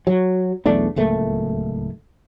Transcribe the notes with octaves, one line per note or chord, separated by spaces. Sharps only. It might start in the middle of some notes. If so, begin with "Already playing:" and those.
F#3
B1 E2 A3 D4
D1 C#2 A3 A#3